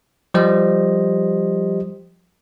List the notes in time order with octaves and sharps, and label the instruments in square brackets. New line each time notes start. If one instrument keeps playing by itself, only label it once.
[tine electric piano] F3 G3 G4 C5 D#5